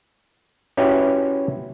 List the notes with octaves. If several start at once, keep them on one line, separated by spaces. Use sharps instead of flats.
C#4 E4 F#4 G4 B4 C#5